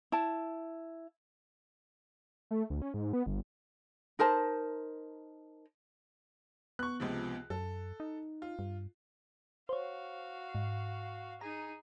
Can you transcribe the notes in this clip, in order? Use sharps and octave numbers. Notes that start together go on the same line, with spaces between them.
E4 A5
A3
D2
C#4
G#2
B3
G1
D#4 A#4 C5 A5
B3 C#6 F#6
C#2 C3 F3
F#2 A4
D#4
F4
G2
F#4 C5 C#5 F5
G#2
D#4 G#4 A#5